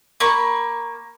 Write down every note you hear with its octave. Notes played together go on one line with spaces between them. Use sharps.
A#3 B5 C#6